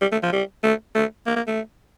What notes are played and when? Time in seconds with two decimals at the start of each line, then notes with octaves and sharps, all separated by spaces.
0.02 G3
0.12 A3
0.23 F3
0.33 G3
0.64 A3
0.95 A3
1.26 A#3
1.37 A#3
1.47 A3